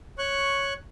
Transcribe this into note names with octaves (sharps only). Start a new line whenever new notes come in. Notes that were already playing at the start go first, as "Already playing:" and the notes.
C#5 C#6 F#6